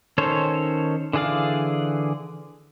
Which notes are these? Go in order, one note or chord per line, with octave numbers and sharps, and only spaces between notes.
D#3 C#4 A4 C5 C#5
D3 E3 G#4 D5 F5